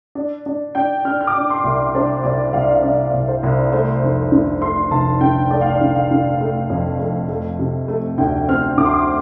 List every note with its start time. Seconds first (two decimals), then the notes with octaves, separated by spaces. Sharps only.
0.15 D4
0.46 D4
0.75 D4 G5
1.05 D4 F6
1.21 F6
1.27 D6
1.35 D4
1.50 C6
1.64 C2
1.95 D4 C5
2.23 C2 D5
2.53 C2 F5
2.72 F5
2.83 D4 D5
3.14 C2
3.28 C5
3.43 C2
3.72 A3 C5
4.03 F1
4.32 D3
4.62 A3 C6
4.91 F1 A5
5.21 D3 G5
5.51 A3 D5
5.61 F5
5.72 D5
5.81 D3
5.95 F5
6.11 D3
6.41 A3
6.70 F2
6.99 A3
7.29 A3
7.59 C3
7.88 A3
8.18 D2 G5
8.48 C4 F6
8.77 D2 D6
8.85 C6
8.94 D6